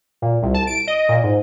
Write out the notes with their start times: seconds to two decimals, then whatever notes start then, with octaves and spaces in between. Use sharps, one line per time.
0.22 A#2
0.43 C2
0.54 A5
0.67 D7
0.87 D#5
1.09 A#2
1.24 G#2